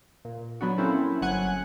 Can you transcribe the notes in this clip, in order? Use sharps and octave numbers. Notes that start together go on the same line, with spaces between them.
A#2
F#3 B3 D4 F#4
A#3 C4 C#4 E4 A4
G1 F#3 F#5 G#5 F#6